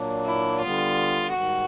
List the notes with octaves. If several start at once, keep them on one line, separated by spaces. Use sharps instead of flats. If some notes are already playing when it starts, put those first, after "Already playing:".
Already playing: A#2 F#3 A#3 D4
E4
D3 G3 B3 F4
G#2 D#3 G3 F#4